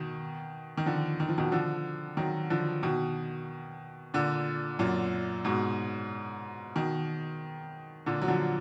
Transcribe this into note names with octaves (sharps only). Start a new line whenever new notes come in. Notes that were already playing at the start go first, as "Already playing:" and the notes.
Already playing: B2 D#3
D#3
D3 F3
D#3
F3
B2 D#3
D3 F3
D#3 F#3
D3 F3
B2 D#3
A#2 D3
F#2 A#2
G#2 B2
B2 D#3
A#2 D3
F#3
D3 F3